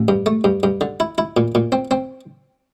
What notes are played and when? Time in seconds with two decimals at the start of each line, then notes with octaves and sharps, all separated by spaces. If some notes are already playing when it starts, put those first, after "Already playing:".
Already playing: A1
0.08 G2
0.26 A3
0.44 G2
0.63 G2
0.81 D3
1.00 E4
1.18 E4
1.37 A#2
1.55 A#2
1.72 C4
1.91 C4